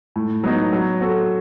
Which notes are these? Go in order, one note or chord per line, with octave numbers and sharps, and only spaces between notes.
A2
F#3 B3 D#4
F#3
C4 F#4 A4